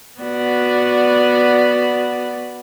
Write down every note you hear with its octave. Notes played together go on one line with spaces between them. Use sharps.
B3 F#4 D5